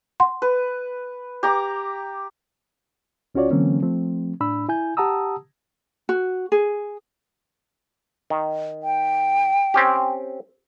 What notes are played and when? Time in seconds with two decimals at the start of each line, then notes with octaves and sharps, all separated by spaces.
0.20 F#5 C6
0.42 B4
1.43 G4 A#5 D6
3.35 D2 C#4 F4 F#4 C#5 D5
3.50 D3 E3 F#3 A#3 C4 C#4
3.82 F3 A3 C4
4.40 A2 D4 B5 E6
4.69 E4 G#5 G6
4.97 G4 F#5 A5 A#5 D#6 E6
6.09 F#4
6.52 G#4
8.30 D#3
8.83 G5
9.74 C4 C#4 G4